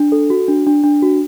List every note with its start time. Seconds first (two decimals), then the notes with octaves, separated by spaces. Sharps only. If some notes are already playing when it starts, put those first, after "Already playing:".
Already playing: D4
0.12 A4
0.30 F#4
0.48 D4
0.67 D4
0.84 D4
1.02 F#4